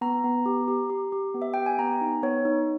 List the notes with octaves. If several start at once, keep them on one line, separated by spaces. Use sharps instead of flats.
B3 A#5
B3
G4
G4
G4
G4
B3
E5
G4 G5
G#5
B3 A#5
D#4
B3 C#5
D#4